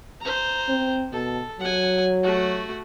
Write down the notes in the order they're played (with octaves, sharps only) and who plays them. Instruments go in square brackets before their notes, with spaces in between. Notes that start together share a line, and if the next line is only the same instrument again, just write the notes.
[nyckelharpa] C5 A#5
[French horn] C4
[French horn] B2 [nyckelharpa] A4
[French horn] F#3 [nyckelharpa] F#5 G#5
[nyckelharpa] A3 F#4